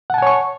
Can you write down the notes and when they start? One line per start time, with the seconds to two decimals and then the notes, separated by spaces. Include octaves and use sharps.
0.10 F#5
0.14 A5
0.18 G#5
0.22 C#5
0.27 C#6